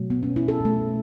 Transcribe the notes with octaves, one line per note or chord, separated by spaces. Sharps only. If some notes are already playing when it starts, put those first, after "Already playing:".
Already playing: B2 F#3 A3
B3
C#4
E4
A4
B2 A3